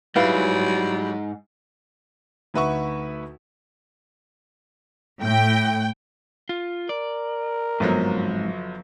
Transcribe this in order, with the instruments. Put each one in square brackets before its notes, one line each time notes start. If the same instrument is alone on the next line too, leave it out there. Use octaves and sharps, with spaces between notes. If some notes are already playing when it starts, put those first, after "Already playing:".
[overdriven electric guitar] G#2 [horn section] F#3 [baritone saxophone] G3 [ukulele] E4 B4 F5
[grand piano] D2 D#4 B4 E5 F#5 C#6
[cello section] A2 [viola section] G5
[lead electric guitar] F4
[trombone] A#4 [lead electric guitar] D5
[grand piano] G1 F3 F#3 [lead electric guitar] F2 G#2